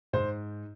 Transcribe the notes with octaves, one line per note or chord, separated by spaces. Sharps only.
G#2 C5